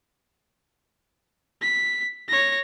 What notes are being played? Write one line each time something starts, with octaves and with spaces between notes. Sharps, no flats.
B6
C#5 A#6